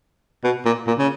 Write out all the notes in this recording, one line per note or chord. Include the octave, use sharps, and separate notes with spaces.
B2
A#2
A#2
C#3